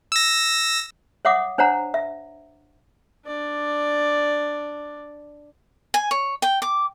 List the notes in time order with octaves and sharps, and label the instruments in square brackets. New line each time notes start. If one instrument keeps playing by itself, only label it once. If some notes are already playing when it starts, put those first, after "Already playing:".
[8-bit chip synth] E6 A#6
[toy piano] C#5 E5 F#5 D6 D#6
D4 C5 C#5 F#5 A#5
E5
[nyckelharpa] D4 D5
[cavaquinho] G#5
C#5
G5
D6